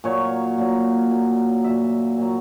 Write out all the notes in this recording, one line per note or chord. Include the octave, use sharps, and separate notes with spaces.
A#2 F#3 C#5
A#2 F#3
A#2 F#3
A#2 F#3 E5
A#2 F#3